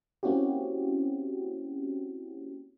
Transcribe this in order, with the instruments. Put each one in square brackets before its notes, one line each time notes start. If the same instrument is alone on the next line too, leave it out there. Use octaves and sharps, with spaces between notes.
[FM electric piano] A#3 C4 C#4 E4 F#4 G4